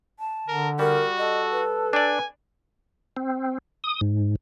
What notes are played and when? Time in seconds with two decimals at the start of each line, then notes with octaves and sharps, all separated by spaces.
0.20 A5
0.48 D3 A#4
0.79 G3 F#4 A#4
1.18 A4 D#5
1.52 B4
1.93 D4 D5 G#5
3.17 C4
3.84 D#6
4.01 G#2